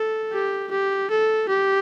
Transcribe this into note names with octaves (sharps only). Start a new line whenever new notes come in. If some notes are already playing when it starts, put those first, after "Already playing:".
Already playing: A4
G4
G4
A4
G4